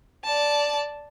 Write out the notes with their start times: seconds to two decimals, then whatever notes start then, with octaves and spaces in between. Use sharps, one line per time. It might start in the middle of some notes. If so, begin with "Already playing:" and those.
0.24 D5 A5